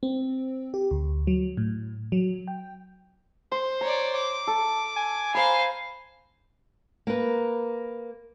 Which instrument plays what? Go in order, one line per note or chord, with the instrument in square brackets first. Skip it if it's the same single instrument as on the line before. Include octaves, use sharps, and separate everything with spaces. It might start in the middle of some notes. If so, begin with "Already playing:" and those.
[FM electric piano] C4
G4
D2
F#3
A2
F#3
G5
[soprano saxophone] C5 [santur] C6
[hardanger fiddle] C#5 D5 [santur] A#5
[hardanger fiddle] D6
[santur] A4
[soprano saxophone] G#5
[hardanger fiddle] C5 F5 [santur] A#5 B5
[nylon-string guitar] A#3 A#4 B4